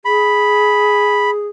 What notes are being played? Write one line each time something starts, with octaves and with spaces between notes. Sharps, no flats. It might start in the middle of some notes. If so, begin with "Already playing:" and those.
G#4 B5